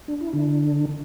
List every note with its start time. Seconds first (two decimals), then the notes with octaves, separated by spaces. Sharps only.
0.08 D4
0.21 E4
0.33 D3 D4